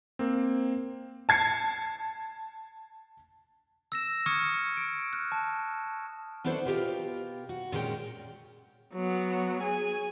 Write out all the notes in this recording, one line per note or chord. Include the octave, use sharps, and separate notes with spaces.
A#3 C4
A5 G#6 C7 C#7
E6 A#6 E7
C#6 D#6 F6 G#6 C#7 D#7
D7
F6 F#6
A5
B3 D4 E4 A4 C5 C#5
B2 F4 G4 A#4 B4 G5
F#4
A#2 G#3 C#4 A#4 C#5 G5
F#3 B3
G#4 G#5